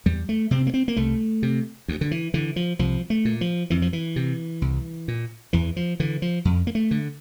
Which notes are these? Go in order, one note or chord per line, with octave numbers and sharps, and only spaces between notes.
E2 G3
A3
C3 C4
A#3
C4
A#3
C2 A3
C3
D2
D3
E3
D3 E3
F3
C2 F3
A3
A#2
F3
F2 E3
F3
E3
C3
C2
A#2
E2 E3
F3
D3 E3
F3
F2
A#3
A3
D3